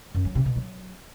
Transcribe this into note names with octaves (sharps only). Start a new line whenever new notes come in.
F#2
F#3
C3
B2
F#3